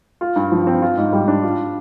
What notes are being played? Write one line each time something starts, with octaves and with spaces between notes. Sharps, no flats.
F4
G2
F3
C4
F4
G#2
G3
D4
F4